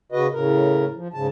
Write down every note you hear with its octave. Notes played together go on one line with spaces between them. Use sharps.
C#3 F#4 B4 D#5
A2 C#3 A#4
F3
G#2 C#3 A5